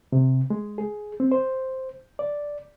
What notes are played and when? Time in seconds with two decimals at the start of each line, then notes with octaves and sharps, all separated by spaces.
0.12 C3
0.50 G#3
0.78 G#4
1.20 C4
1.32 C5
2.19 D5